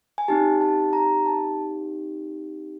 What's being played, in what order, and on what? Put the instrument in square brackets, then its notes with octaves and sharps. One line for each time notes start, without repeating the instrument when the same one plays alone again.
[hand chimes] G#5
C4 D#4 G4 A5
A5
A#5
A5